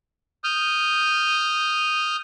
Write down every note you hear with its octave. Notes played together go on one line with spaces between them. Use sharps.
D#6 F6 G6